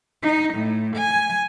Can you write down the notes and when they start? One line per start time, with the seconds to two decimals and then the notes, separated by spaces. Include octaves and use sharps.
0.23 D#4
0.55 A2
0.96 G#5